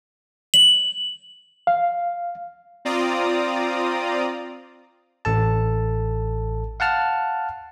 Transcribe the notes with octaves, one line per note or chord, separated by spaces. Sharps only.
F#7
F5
C4 F4 D5 A#5 D#6
A1 A4 A5
F5 F#5 A5 F6